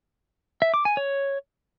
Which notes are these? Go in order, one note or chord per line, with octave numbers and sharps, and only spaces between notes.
E5
D6
G#5
C#5